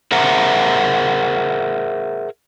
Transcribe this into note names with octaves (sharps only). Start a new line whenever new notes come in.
G#4 A#4 C5 E5 F#5 A#5